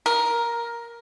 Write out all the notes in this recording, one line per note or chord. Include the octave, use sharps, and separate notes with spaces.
A#4